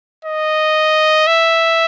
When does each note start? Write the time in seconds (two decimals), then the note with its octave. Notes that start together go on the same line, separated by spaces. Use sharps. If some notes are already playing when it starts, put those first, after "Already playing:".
0.25 D#5
1.27 E5